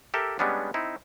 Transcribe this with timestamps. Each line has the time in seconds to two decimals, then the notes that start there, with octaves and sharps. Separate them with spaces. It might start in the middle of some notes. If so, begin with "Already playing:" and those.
0.14 G4 A4 A#4 E5
0.39 G3 G#3 B3 C#4 D4
0.74 C4 D#4 E4